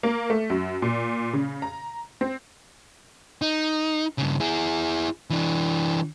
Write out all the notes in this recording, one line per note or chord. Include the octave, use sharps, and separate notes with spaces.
A#3
A3
F#2
A#2
C#3
A#5
C4
D#4
G2 C#3
E4 G#4
E3 D4